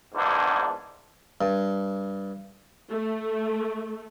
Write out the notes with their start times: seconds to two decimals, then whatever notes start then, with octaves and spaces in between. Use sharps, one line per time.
0.14 A#1 E2 G#2 B3 D4
1.41 G2
2.91 A3